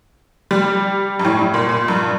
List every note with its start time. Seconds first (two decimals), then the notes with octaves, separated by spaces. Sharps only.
0.51 G3
1.20 G2
1.25 A2
1.39 G2
1.54 A#2
1.69 A#2
1.88 G2